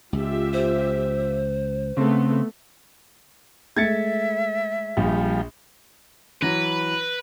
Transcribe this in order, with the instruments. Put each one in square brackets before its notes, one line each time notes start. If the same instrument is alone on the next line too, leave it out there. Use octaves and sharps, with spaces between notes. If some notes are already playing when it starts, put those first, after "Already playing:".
[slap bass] C#2 [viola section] F4 G4 E5
[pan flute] C5
[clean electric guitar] C#3 C4 [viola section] A3 B3
[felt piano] G#3 A3 [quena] E5 [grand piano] G#6 A6 C#7
[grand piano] A#1 [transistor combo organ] F3 G3
[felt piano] E3 F#3 A#6 [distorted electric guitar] B4